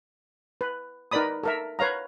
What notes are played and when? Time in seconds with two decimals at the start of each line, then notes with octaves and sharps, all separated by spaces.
0.61 B4
1.11 D#4 A#4 B4 D5 B5 D#6
1.43 A4 A#4 E5
1.79 B4 C#5 F5 A#5